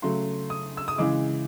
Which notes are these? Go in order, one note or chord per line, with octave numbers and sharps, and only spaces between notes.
C#3 F#3 A3 C6
D#6
E6
D#6
C#3 E3 G#3 D6